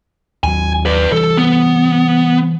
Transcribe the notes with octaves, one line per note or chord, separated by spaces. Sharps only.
D#2 F#3 G#5
B4 D5
E3 G3 A4
B3